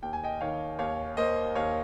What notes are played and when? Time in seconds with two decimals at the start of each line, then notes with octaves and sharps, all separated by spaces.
0.02 D#2 G5
0.13 G#5
0.24 D#5 G5
0.41 D#3 C#5 F5
0.79 D#2 C#5 F5
1.17 A#3 C5 D#5
1.55 D#2 C#5 F5